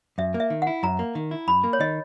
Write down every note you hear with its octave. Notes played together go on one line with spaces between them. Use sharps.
F#2 E5
A#3
E5
D#3
E4 F#5
F#2 A#5
A#3
D#3
E4
F#2 B5
A#3
C#5
D#3 D#5